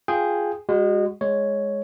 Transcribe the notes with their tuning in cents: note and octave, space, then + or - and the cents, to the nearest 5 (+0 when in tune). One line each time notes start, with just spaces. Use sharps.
F4 +0 G#4 +0 G5 +5
G#3 -30 F#4 +0
G#3 +0 C#5 +0